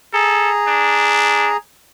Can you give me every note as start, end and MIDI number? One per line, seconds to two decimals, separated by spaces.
0.14 1.57 68
0.14 0.50 69
0.14 1.57 82
0.67 1.51 62